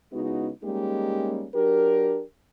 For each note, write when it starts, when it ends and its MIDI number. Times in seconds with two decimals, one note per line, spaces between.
0.12 0.50 49
0.12 0.50 56
0.12 0.50 59
0.12 0.50 63
0.12 0.50 64
0.12 0.50 66
0.63 1.47 55
0.63 1.47 56
0.63 1.47 58
0.63 1.47 61
0.63 1.47 63
0.63 1.47 67
1.54 2.22 54
1.54 2.22 62
1.54 2.22 67
1.54 2.22 70